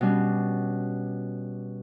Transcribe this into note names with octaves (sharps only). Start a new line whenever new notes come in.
B2 G3 C#4 D4